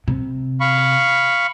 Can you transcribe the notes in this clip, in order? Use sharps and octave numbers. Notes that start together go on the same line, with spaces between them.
C3
F5 B5 C#6